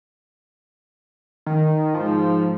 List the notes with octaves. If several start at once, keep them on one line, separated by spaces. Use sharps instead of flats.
D#3
G#2 F3